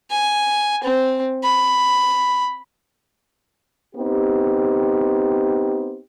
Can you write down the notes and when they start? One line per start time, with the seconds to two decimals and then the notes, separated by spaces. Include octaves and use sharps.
0.11 G#5
0.84 C4
1.44 B5
3.95 B3 C4 D#4 G4